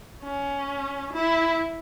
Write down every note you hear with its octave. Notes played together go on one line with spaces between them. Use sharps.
C#4
E4